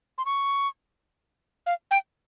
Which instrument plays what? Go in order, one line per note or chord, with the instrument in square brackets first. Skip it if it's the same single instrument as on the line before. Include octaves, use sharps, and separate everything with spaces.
[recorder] C6
C#6
F5
G5